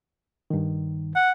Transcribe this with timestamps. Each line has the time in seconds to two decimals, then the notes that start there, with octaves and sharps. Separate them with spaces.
0.50 G2 D#3
1.15 F#5